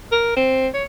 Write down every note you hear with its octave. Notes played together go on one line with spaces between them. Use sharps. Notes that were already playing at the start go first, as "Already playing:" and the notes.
A#4
C4
C#5